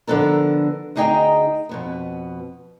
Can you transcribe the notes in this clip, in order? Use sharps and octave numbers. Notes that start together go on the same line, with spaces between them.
D3 F3 B3 A4 A#4
D2 D#4 G#4 D#5 G5 A#5
F2 B2 B3